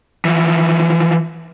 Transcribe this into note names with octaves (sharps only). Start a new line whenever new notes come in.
E3 F3